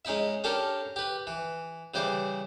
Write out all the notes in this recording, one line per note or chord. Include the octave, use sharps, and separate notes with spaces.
G#3 C#4 D#4 E4 E5
C#4 D4 G4 A4 A#4
G4 B4
E3
C#3 E3 G3 C5 D5